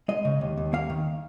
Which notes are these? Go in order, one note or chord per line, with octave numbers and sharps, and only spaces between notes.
G#3 D#5
C#3
D#2
D#2
A#3 F5
D#3